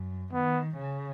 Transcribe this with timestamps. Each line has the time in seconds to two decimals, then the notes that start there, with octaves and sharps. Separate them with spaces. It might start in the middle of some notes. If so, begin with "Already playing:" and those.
Already playing: F#2
0.33 D#3 B3
0.77 C#3